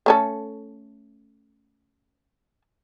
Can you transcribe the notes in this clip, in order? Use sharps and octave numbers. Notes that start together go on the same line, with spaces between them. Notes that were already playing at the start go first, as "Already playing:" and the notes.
A3 C#4 A4